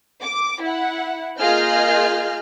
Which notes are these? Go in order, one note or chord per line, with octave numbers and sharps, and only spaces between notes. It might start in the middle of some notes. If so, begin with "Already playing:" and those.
D6
E4 F#5
A#3 F4 G#4 D#5 F6 G6